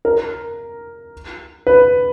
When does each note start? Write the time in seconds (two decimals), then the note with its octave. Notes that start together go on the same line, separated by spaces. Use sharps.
0.05 A#4
1.67 B4